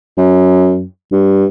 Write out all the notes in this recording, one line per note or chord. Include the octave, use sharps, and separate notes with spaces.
F#2
G2